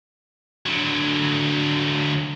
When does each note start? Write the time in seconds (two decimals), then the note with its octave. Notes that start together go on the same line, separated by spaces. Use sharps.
0.66 D3 F#3